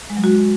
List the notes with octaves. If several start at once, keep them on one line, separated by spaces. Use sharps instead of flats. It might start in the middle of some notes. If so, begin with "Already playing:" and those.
G#3
F#3
F#4